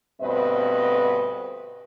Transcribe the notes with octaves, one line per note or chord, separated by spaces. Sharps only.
D2 G2 B2 C4 B4 D#5